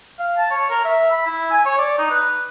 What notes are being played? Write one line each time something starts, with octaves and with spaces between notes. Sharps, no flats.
F5
A5
C#5
A#4
E5
B5
E4
G#5
C#5
D5
D#4
B4